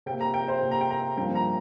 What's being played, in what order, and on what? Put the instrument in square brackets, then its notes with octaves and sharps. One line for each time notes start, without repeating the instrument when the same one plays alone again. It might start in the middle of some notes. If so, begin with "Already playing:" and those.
[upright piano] C3 G5
A#3
A#5
G5
C5
C3 A#3
A#5
G5
A#5
G2 F3 A#3 G5
A#5